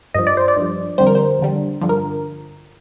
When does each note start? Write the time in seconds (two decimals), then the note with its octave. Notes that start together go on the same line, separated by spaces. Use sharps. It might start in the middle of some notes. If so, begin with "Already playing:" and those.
0.14 G2 F3 D#5
0.27 D5
0.37 C5
0.48 D5
0.57 G2 F3
0.98 F2 D3 G3 C5
1.07 A#4
1.15 C5
1.39 F2 D3 G3
1.81 G2 D3 F3
1.89 A#4